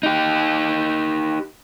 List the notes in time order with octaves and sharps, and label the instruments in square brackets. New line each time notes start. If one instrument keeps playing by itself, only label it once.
[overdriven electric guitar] D#4 G4